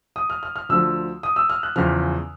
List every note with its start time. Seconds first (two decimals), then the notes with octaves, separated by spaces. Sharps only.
0.16 D#6
0.30 F6
0.43 F6
0.56 F6
0.69 D2 D3 F3 E6
1.23 D#6
1.36 E6
1.50 F6
1.63 F#6
1.76 E2 C#3 F3 F6